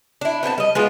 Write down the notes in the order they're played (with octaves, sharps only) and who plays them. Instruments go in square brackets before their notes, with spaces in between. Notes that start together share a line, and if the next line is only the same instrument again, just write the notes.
[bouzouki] D4 E4
B3 C4 G5 A5
G3 D#5
G#3 B3 F4